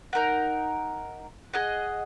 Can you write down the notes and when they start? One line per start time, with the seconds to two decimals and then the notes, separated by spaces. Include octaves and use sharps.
0.13 D#4 A#4 F#5
1.54 G#4 D#5 F#5